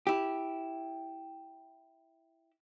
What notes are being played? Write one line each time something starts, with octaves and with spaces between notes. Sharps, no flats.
E4 G4